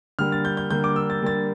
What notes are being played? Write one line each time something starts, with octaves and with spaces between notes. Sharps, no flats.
D3 G3 A#3 F6
A6
G6
G6
D3 G3 A#3 G6
D6
E6
A6
D3 G3 A#3 A6